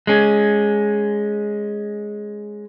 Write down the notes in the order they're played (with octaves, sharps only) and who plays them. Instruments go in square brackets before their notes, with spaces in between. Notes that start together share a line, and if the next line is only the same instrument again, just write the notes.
[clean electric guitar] G#3 C#4